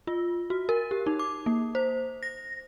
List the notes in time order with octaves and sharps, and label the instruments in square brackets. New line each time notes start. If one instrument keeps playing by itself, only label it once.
[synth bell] F4
F#4
A#4
G4
D#4
D6
A#3
C5
A#6